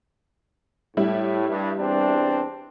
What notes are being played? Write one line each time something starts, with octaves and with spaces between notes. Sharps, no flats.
A2 G3 E4
G2
E2 C4 D4